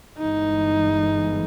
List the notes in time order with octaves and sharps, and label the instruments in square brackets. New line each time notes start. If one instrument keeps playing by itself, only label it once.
[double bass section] G1 G2 E3 G#3 [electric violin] D#4